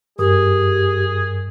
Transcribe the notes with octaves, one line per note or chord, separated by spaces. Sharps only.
G2 G4 G#4 A#4 D#6